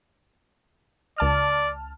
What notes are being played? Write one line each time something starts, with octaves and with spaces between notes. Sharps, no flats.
C#2 D5 A5 F6